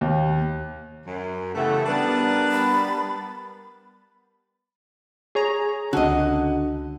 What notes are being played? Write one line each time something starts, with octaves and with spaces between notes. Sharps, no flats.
D#2
F#2
C#3 E3 A3 B3 G4 A4 F#5
G3 B3 D4 A#4 B4 A6
B5
G#4 C#5 A#5
C#2 D3 C#4 F#4 D#5